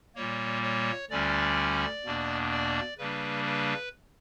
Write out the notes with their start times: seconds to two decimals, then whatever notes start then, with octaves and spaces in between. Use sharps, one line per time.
0.16 A#2 G3 A#3 C#5
0.63 C#5
1.10 D2 D3 G3 C#4 D5
2.05 E2 B2 A#3 D4
2.52 D5
2.98 C#3 G3 A#3 D4 B4
3.46 B4